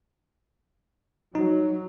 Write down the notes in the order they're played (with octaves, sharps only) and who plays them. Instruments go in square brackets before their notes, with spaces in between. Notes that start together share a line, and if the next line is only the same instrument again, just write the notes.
[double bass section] F#3 [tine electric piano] D#4